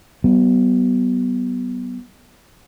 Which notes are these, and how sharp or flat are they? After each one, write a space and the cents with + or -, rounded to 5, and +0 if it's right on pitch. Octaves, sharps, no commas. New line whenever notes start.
F#3 +45 B3 +0